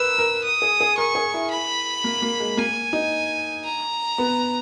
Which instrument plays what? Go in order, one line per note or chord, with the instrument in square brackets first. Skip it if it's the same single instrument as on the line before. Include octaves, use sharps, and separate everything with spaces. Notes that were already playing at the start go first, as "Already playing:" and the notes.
Already playing: [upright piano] A#4 B4 [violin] E6
[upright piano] A#4
[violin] D#6
[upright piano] G#4
G#4
[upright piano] A#4 [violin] C#6
[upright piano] G#4
E4
[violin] B5
[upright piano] A#3
A#3
G#3
[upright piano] A#3 [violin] G#5
[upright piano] D#4
[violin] A#5
[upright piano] B3